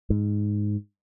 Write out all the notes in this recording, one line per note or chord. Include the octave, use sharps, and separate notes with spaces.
G#2